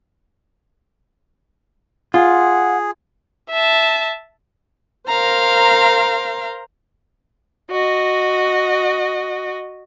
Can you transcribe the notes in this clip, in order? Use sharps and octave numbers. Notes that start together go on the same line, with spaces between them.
F4 G#4 F#5
E5 A5
A#4 C5 F5 A#5
F#4 D#5